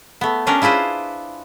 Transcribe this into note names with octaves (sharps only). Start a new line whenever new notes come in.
A3 B3
C#4 D4 G4 G#4 A#4
E4 F4 G#4 B4 C5